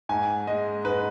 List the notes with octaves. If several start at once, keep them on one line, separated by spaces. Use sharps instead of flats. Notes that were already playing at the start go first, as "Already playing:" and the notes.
G#2 G#5
G#3 D#5
G#2 B4